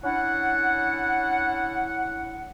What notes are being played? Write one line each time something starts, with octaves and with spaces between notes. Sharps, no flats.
C#4 D4 E4 F#5